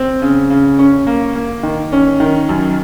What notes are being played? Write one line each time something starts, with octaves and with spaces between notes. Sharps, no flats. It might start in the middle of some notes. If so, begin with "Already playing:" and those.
Already playing: C4
C#3
C#3
C#4
A#3
A#3
D#3
C#4
D#3
F#2